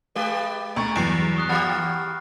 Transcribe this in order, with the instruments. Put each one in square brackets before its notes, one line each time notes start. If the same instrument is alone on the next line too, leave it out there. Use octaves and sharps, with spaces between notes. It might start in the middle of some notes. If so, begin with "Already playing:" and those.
[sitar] G#3 G4 B4
[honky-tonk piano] D2 C#6 [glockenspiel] A#5 A6
[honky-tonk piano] E2 [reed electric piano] G2 E3 F#3 [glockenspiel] C7 D7
[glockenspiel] C#6 D#6 F#6
[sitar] E3 G4 [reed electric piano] F#5 [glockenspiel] B5 F6 A6